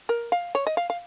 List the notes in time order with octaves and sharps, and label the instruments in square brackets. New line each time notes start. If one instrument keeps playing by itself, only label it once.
[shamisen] A#4
F5
C#5
D#5
F5
F5